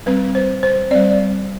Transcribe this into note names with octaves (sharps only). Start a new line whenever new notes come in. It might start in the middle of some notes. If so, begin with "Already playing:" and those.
G3 C4 B4
C5
C5
G3 C4 D5